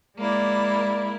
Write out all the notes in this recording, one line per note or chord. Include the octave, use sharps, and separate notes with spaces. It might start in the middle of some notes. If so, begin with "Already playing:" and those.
G#3 A#3 E4 D5